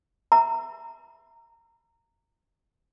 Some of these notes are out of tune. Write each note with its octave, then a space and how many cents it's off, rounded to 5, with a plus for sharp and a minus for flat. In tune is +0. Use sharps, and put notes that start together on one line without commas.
E5 +0 A#5 -15